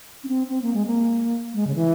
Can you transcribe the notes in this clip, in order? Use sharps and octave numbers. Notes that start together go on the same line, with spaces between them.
C#4
C4
C4
A#3
G#3
A#3
G#3
C#3
E3